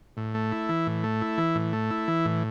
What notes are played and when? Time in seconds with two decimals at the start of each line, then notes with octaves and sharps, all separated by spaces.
0.17 A2
0.35 A3
0.52 E4
0.69 E3
0.87 A2
1.04 A3
1.22 E4
1.38 E3
1.55 A2
1.73 A3
1.91 E4
2.08 E3
2.25 A2